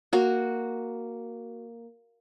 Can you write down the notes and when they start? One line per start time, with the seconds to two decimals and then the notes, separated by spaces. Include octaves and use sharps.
0.13 A#3 F#4